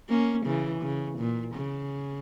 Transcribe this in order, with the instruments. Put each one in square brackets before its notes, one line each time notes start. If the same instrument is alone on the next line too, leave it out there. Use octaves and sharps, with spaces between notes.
[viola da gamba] A#3 C#4
C#3 E3
C#3
A#2
C#3